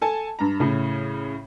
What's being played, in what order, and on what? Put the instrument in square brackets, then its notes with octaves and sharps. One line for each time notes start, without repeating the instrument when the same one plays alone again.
[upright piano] A4 G#5 A5
G2 A#5
A2 C#3